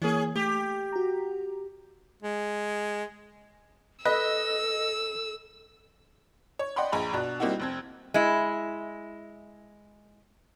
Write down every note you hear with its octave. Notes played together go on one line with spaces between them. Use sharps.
E3 A#3 C#4 G#4
A3 G4
F#4 A#5
G#3
A4 B4 D#5 E6
C#5
D5 D#5 F#5 G5 B5 C6
A#1 G#4 A#5 B5
B2 D4 F#6
G3 A#3 C4 D#4 E4 F#4
F1 C4 G#6
G#3 E4